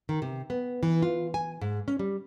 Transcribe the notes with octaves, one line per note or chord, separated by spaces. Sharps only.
D#3
C3
B3
E3
F4
G#5
G#2
C#4
G3